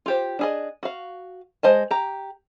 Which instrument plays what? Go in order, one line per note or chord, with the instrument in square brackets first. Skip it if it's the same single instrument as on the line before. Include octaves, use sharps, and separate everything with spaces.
[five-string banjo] F4 G4 C5
D4 G#4 D#5
F#4 F5
G#3 C5 D#5 A5
G4 A#5